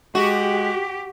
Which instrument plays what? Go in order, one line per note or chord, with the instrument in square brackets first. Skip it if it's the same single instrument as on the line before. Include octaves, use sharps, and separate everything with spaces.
[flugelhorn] G#3 [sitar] F#4 [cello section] G4